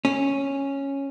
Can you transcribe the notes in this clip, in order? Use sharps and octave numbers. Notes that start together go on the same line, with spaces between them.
C#4